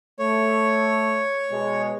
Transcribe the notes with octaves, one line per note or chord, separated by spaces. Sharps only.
A3 C#5
B2 G#3